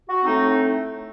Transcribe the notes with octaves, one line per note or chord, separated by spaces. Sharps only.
F#4
A2 A3 C4 D#4